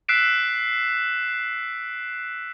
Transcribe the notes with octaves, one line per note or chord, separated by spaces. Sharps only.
E6 F#6 B6 C7 D7 E7